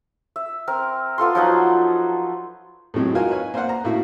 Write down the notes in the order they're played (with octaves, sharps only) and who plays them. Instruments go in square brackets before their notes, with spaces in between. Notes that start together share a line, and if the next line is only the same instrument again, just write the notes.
[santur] E5
C4 A#4
B3 F4 A4 C6
F3 F#3 D#4 F#5
[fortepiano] A2 C3 F#3 G#3
D#4 F4 F#4 A#4 F5 G#5
B4 C#5 F5 G#5
A#3 C5 D5 F5 F#5
A#5
A2 A#3 E4 F#4